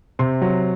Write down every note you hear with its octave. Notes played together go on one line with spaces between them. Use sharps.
C3 C6
F#3